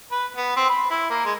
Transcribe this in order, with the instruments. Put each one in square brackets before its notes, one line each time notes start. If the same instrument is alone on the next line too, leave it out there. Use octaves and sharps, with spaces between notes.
[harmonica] B4
B3
C4
B5
E4
A#3
G#3